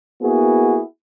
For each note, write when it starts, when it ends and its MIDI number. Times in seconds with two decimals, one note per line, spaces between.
0.22 0.80 58
0.22 0.80 59
0.22 0.80 64
0.22 0.80 66
0.22 0.80 68